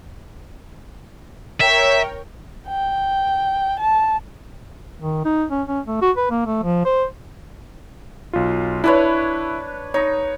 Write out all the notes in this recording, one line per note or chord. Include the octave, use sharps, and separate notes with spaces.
A#4 C#5 E5 G5
G5
A5
D#3
D#4
C#4
C#4
A3
F#4
B4
A#3
A3
F3
C5
B1 F4
D4 E4 B4 C#5
D#4 C#5